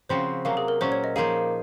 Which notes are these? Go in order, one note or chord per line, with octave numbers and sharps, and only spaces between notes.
C#3 F3 C4 F#4 C5
C3 F#3 A#3 F5
G#4
A#4
A#2 F#3 C#4 C5
C#5
D#5
F3 A#3 D#4 G#4 F5